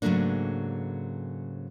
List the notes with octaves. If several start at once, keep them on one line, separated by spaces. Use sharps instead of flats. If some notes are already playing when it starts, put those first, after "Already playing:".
G#2 C#3 F#3 A3 A#3 D4